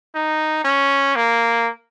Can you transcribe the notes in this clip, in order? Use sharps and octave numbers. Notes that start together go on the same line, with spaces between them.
D#4
C#4
A#3